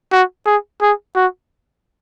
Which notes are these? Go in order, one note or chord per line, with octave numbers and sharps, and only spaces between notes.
F#4
G#4
G#4
F#4